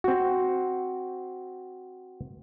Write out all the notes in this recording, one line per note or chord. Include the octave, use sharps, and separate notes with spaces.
C4 F#4